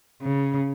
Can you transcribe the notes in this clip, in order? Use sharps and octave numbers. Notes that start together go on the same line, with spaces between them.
C#3